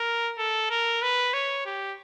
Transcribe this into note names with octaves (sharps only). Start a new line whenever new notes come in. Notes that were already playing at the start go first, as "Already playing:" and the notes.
Already playing: A#4
A4
A#4
B4
C#5
G4